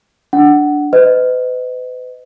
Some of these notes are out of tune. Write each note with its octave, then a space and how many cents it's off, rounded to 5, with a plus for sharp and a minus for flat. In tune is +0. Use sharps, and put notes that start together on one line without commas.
D4 +0 F#5 +15
B4 +40 D#5 +0